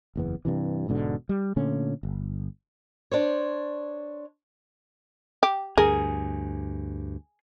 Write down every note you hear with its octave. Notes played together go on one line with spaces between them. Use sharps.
F#1 E2 B3
G2 C3 E3
E1 G#2 B2 D3
G3
A#2 D3 A3 C#4
G1
D4 C5 C#5
G4
D2 G2 G#4 A#4